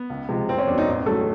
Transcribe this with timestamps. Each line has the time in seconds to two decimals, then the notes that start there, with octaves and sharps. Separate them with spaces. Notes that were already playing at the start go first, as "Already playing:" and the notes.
Already playing: B3
0.10 C#2
0.29 C3 F3 G#3
0.49 F#1 C4
0.58 C#4
0.68 E2 B2 D4
0.78 D#4
0.87 A1
1.06 D#3 F#3 A3 A4